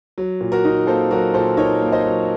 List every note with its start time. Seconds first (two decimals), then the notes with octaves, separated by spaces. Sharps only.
0.18 F#3
0.41 A#2
0.52 F#4 A#4
0.65 D#4
0.87 A#3 A4 C5
1.11 F#3 F#4 A#4
1.34 A#2 A4 C5
1.57 D#4 A#4 C#5
1.82 A#3
1.92 C5 D#5
2.05 F#3